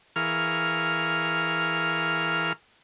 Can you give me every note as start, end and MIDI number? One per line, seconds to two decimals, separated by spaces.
0.16 2.53 52
0.16 2.53 68
0.16 2.53 70
0.16 2.53 77
0.16 2.53 85
0.16 2.53 89